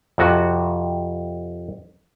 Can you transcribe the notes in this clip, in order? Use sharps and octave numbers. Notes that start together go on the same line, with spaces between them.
F2 C3 F#4